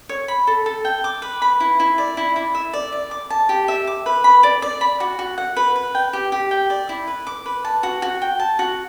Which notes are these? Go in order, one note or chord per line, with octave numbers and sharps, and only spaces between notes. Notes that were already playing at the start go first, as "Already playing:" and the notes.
C#5
B5
A4
A4
G5
D6
B4
B5
E4
E4
D5
E4
E4
E5
D5
D5
D6
A5
G4
E5
D6
B4
B5
D5
D5
B5
F#4
F#4
F#5
B4
B4
G5
G4
G4
G5
D5
E4
B4
D6
B4
A5
F#4
F#4
G5
A5
F#4